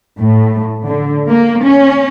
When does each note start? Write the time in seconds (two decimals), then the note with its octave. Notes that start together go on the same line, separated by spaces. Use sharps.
0.19 A2
0.88 D3
1.29 A#3
1.62 C#4